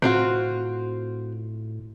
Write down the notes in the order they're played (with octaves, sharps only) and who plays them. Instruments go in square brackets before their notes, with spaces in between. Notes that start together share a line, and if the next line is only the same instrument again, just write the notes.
[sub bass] A2 [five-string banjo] C4 F4 F#4